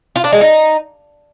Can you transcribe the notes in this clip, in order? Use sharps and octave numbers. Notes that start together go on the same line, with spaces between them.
F4
D4
G#3
D#4